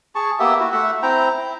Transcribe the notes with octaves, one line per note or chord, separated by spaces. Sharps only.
G#4 A5 C#6
A#3 B3 G4 E5
E4 F#4
A3 E5 F#5
C4 E4 G5 A#5
E4